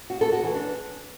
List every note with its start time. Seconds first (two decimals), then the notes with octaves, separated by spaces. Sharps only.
0.10 F#4
0.21 A4
0.32 F#4
0.43 E3
0.55 D4